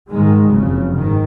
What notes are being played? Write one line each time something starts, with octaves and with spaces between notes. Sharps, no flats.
G#2 D#3 G#3
F#1 F2 C#3
G#2 D#3